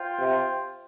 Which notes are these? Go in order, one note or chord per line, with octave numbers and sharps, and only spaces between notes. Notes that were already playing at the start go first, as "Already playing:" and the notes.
Already playing: F4 C5 G5
C3